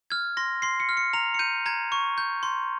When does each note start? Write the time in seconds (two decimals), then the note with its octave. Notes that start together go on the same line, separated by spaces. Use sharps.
0.10 F6 G#6
0.37 C6 A#6
0.62 C6 C7
0.80 C#7
0.89 F6
0.97 C#7
1.13 A#5 F7
1.34 C#7
1.39 G6 D#7
1.66 A#5 G#6
1.92 C#6
2.18 G6
2.43 C6